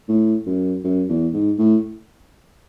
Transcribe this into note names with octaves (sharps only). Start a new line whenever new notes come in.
A2
F#2
F#2
E2
G#2
A2